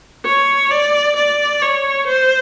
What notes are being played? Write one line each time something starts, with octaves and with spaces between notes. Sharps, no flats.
C#5
D5
D5
C#5
C5